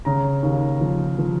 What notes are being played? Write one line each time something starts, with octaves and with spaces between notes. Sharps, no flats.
C#3 A#5
D#2
F3
F3